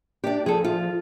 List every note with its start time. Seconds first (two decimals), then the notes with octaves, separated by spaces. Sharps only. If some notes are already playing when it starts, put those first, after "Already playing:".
0.24 D4 G4 D5
0.46 F3 G#4 A4
0.64 F4